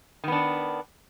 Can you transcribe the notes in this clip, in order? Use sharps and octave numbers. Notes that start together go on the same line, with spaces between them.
D#3 B3 D4